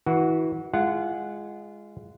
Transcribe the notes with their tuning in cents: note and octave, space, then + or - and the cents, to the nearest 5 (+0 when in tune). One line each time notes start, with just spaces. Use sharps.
E3 -30 F#4 +0
G#3 +0 F4 -25 F#5 +0